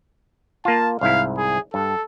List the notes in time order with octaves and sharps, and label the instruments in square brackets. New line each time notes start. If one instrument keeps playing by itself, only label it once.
[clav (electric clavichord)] A#3 F4 [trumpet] A5
[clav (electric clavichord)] C2 G#2 E4 [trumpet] F5
[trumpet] G#4
[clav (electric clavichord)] G2 [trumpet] A4